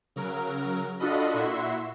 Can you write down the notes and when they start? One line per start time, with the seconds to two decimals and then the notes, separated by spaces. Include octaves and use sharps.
0.16 C#3 F#3 A#4
1.00 D4 F4 F#4 A4 D#5 B5
1.34 A#2 E4 F#4 E5 C6 C7